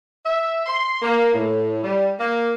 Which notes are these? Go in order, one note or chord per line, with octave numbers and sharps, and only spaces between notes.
E5
C6
A#3
A2
G3
A#3